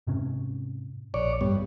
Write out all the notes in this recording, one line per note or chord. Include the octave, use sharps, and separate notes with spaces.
G#2 C3 C#4
A#1 C#5 D5
G2 B3